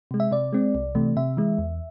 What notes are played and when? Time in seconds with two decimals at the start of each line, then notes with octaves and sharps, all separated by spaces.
0.11 C3 G#3
0.20 E5
0.31 C3 D5
0.53 G#3 C4
0.75 C2
0.95 C3 E3 A3
1.17 C3 E5
1.37 E3 G#3
1.58 E2